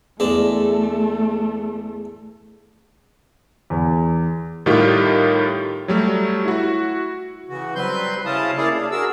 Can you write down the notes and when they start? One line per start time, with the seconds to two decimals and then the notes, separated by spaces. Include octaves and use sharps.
0.20 E2 G#3 A3 D4
3.70 E2
4.66 A2 D#3 G3 F4 G4
5.88 F#3 G3 A3
6.45 E4 F#4
7.49 C#3 E3 F#4
7.75 F#3 G3 C4 B4 C6 G6
8.25 C#3 C#4 E4 F5 A5 D#6
8.57 A#3 E4 G#4 D5 F5
8.75 D4
8.91 F#4 G#4 A#4 E6